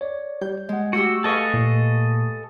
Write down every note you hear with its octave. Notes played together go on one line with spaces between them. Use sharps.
C#5 D5
G3 G6
G#3 D#5 F#5
A3 F#4 G4 E6 G6
G#4 A4 B4 D#5 F5 C#6
A#2